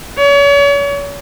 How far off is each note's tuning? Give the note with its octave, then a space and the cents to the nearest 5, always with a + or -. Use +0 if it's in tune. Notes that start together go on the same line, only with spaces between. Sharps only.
C#5 +40